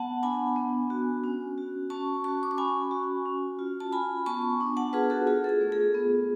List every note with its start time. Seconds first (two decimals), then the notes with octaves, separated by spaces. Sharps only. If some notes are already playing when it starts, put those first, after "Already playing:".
Already playing: B3 F#5 A5
0.23 D4 G#5 B5
0.56 B3
0.90 F#4
1.24 C#4
1.58 F#4
1.90 C#4 A5 C#6
2.24 F#4 A5 C#6
2.43 D6
2.51 C#6
2.58 C#4 G#5 B5
2.91 F#4
3.26 C#4
3.59 F4
3.80 A5
3.92 F4 G#5 B5
4.26 B3 A5 C#6
4.60 D4
4.77 F#5 A5
4.93 F4 G#4 B4
5.10 F#4 A4
5.27 F4 G#4
5.44 A4
5.49 G#4
5.61 A3
5.72 G#4
5.94 B3